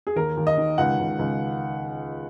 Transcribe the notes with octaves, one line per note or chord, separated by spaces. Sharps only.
G#4
D#2 A#4
D#2
D#5
D#3
C#2 F#5
C#2
C#2